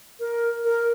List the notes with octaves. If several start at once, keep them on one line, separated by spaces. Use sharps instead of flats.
A#4
A#4